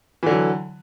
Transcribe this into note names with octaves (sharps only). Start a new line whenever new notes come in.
D3 E3 F#3